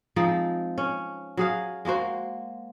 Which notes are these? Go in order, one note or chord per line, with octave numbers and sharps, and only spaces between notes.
F3 G#3 C4 D#4
C#4
F#3 G#4 F5
G#3 A#3 F#4 C5